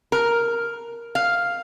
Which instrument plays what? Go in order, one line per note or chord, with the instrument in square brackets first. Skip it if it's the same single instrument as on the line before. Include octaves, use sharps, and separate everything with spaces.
[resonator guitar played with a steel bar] A#4
F5